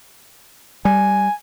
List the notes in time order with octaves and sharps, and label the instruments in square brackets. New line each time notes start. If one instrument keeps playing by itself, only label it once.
[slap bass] G3 [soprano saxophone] G#5